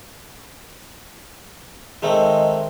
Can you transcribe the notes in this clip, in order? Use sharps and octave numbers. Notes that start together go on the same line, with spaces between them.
D#3 G#3 A3 C4 D#4 G#4 A#4 C5